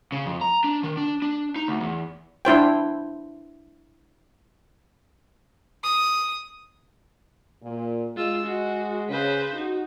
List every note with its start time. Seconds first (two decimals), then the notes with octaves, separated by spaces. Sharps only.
0.12 C#3
0.26 F2
0.41 A#5
0.64 D4
0.84 D#3
0.97 D4
1.22 D4
1.56 D#4
1.68 D2
1.80 E2
2.45 D4 E4 C5 G5
5.84 D#6
7.62 A#2
8.17 G#3 F4 E6
8.46 F#4
9.09 C#3 B4 C5
9.55 D#4 F#4